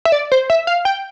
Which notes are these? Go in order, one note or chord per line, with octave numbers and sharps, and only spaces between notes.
E5
D5
C5
E5
F5
G5